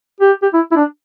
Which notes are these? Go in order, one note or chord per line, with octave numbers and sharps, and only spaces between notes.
G4
G4
E4
E4
D4